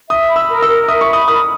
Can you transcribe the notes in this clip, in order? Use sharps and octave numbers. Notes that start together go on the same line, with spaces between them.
E5 D#6
B5
E6
A#4
E6
A#4
E5 D#6
C#6
B5
D#6
A#4 D#6